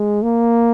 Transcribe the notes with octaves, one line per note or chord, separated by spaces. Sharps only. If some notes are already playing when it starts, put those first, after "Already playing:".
Already playing: G#3
A#3